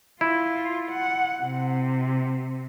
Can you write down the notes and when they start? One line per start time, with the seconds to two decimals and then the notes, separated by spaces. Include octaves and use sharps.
0.21 E4 F4
0.91 F#5
1.42 C3